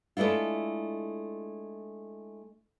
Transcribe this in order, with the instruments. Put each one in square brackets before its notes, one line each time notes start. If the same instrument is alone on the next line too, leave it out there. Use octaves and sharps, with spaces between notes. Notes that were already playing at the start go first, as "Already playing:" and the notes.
[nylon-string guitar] G#3 A3 D4 E4 F4